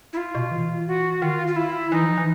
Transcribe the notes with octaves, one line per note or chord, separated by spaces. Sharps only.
E4
F4
B2
E3
F#4
D#3 F4
F4
E4
E3 D#4
F3
E3